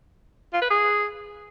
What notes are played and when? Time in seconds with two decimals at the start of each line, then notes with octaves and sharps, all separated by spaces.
0.53 F4
0.62 B4
0.70 G#4